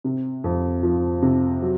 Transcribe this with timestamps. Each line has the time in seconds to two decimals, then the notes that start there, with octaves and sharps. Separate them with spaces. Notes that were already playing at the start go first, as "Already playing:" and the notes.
0.04 C3
0.44 F2
0.83 F3
1.22 C3
1.62 F#3